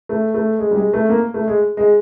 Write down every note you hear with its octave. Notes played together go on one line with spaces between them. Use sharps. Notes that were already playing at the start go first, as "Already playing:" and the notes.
A3
A3
G#3
G3
G#3
A3
A#3
A3
G#3
G#3